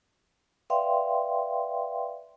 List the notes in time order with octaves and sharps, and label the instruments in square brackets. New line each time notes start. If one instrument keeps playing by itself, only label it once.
[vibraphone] B4 D5 E5 F5 G5 C6